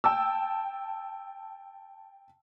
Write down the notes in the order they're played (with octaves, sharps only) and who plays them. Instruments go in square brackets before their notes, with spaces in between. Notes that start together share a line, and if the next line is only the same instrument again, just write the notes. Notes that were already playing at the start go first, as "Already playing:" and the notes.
[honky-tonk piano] G5 A5 E6